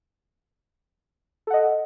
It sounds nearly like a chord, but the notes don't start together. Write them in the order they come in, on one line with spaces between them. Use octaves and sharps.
A4 F#5 D#5